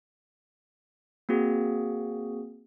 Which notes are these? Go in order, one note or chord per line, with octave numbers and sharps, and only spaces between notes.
A#3 C4 F#4 G#4